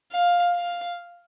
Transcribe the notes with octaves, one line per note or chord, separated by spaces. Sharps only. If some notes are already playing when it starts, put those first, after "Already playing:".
F5
F5